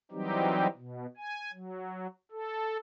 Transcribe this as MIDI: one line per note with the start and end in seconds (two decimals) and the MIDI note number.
0.11 0.67 52
0.11 0.67 54
0.11 0.67 55
0.11 0.67 60
0.11 0.67 63
0.11 0.67 67
0.76 1.06 47
1.17 1.52 80
1.53 2.07 54
2.32 2.77 69